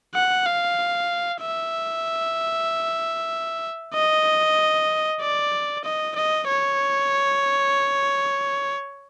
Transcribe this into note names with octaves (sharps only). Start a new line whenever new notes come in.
F#5
F5
E5
D#5
D5
D#5
D#5
C#5